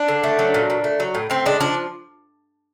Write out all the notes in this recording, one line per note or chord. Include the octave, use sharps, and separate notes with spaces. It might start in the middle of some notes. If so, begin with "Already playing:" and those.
Already playing: D4
D3
A3
F#3
A#2
A#2
A3
F#3
A2
A2 C4
G#3 D4
F3 D4